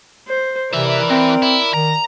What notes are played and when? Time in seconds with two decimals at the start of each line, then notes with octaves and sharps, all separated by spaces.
0.27 C5
0.73 C3 E3 A#4 D5 E5
1.10 E3 C4
1.42 E4
1.74 D#3 A#5